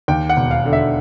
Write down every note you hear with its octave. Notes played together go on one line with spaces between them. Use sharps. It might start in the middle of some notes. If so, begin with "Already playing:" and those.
D#2 G5
F#5
E1
F5
D3
E5